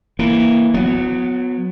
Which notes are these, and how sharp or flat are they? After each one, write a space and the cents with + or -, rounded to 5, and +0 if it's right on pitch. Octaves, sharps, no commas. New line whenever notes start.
E3 +0 A#3 +0
F#3 -20 B3 +20